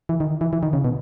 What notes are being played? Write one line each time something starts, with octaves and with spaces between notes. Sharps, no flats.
E3
D#3
E3
E3
D#3
C#3
B2